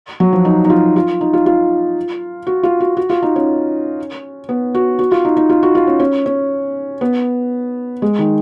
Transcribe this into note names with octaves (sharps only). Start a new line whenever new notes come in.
F#3
F3
D#4
D#4
F4
F4
D#4
F4
F4
F#4
F4
F#4
F#4
F4
D#4
C#4
B3
F#4
F#4
F4
D#4
D#4
F4
F#4
F4
C#4
C#4
C#4
B3
G#3
D#3